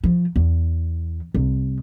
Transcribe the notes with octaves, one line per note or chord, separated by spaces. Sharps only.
F3
E2
C2